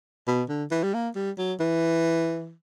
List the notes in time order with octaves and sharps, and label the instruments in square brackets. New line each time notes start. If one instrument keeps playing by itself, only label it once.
[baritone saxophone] B2
D3
E3
G3
A#3
G3
F#3
E3